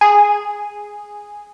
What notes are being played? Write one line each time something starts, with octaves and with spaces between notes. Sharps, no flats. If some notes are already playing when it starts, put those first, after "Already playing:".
G#4